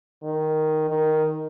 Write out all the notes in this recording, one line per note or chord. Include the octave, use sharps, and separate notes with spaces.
D#3
D#3